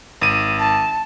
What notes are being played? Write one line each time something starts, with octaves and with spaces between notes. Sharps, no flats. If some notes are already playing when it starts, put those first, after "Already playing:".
G#1 D#7
A5